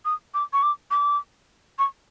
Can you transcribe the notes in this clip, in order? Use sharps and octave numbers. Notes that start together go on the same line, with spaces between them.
D#6
D6
C#6
D6
D6
C#6